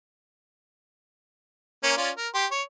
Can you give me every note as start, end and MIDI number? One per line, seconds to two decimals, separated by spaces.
1.83 1.96 58
1.83 1.96 61
1.97 2.10 61
1.97 2.10 65
1.97 2.10 74
2.17 2.28 70
2.34 2.46 67
2.34 2.46 84
2.51 2.62 73